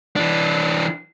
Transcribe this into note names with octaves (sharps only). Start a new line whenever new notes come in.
E3 D4